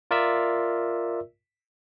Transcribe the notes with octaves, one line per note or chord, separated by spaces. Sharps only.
F4 A#4 D5 E5 E6